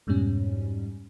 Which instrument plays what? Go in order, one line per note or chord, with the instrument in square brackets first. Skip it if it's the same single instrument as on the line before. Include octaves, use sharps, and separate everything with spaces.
[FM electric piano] F2 G#2 B2 G3 C#4